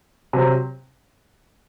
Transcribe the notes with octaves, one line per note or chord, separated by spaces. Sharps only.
C3 F#3 C4